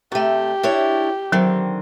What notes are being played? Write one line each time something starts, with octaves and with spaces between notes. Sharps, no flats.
C3 A3 G4
D4 E4 C#5
D3 D#3 F#3 C4